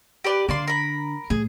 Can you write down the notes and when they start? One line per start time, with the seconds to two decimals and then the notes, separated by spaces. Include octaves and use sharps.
0.24 G4 B4 D5
0.49 D3 A#3 D5 C6
0.67 A#4 B5
1.30 A2 G#4